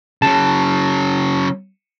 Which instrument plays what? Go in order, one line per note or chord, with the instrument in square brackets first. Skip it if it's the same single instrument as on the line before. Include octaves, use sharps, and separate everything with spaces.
[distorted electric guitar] C#3 F#3 [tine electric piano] A5